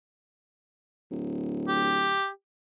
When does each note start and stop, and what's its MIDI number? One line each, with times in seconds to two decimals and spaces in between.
1.11 2.26 26
1.68 2.28 67